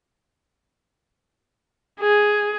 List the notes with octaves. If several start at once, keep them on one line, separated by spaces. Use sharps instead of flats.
G#4